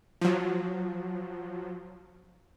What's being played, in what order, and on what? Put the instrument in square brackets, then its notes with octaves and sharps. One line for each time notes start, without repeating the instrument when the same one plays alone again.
[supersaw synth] F3 F#3